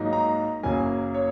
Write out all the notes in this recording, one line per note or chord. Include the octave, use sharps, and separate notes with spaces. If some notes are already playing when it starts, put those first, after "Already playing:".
Already playing: G#2 F#3 A#3 D#4
A#5
F#1 F#2 C#3 F#3 A#3 G#5
C#5